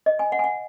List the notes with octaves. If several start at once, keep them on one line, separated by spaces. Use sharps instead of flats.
D#5
G#5
F#5
G#5
F#5